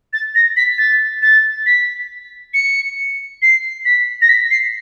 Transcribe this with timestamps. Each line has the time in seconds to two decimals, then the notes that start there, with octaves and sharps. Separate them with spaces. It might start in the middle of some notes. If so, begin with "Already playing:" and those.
0.13 A6
0.35 A#6
0.57 B6
0.78 A6
1.23 A6
1.66 B6
2.54 C#7
3.42 C7
3.85 B6
4.22 A#6
4.29 B6
4.51 C7